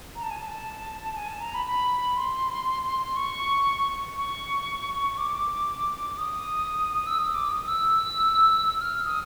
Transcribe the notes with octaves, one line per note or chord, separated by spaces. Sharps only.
A#5
A5
G#5
A5
G#5
A5
A#5
B5
B5
C6
C#6
C#6
D6
D6
D#6
E6
D#6
D6
D#6
E6
E6
F6
D#6